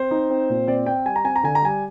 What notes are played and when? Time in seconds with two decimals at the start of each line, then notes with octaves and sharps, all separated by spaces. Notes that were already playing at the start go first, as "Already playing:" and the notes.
Already playing: C4 C5
0.11 D#4
0.30 C4
0.50 A#2
0.67 C4 D5
0.86 C4 G5
1.05 G3 G#5
1.16 A#5
1.24 C4 G#5
1.36 A#5
1.43 D3 G#5
1.55 A#5
1.62 G3 G#5